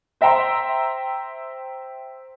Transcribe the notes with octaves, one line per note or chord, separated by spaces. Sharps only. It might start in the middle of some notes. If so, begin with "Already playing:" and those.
C5 E5 G5 A#5 C6